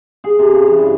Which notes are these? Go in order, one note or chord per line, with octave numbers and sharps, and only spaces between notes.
G#4
C3
C#3
E3
G2